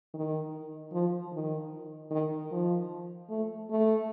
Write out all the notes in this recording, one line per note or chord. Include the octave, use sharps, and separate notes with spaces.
D#3
F3
D#3
D#3
F3
A3
A3